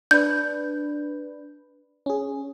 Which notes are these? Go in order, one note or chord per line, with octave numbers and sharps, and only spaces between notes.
D4 B4 G6
C#4 G#4